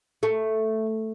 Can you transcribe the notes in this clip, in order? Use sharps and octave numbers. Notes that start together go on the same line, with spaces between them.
A3